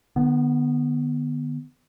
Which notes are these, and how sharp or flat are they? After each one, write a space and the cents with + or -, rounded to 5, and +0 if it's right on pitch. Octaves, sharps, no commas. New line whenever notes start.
D3 +45 B3 -10